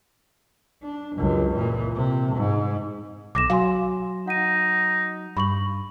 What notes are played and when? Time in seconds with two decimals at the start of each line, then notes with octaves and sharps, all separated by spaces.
0.83 D4
1.16 C#2 F#2
1.55 A#2 E3
1.95 C3
2.35 G#2
3.35 B1 D6 A#6 E7
3.50 F#3 F5 G#5 C6
4.28 D#4 F#5 D#7
5.37 G2 B5 C#6 F#7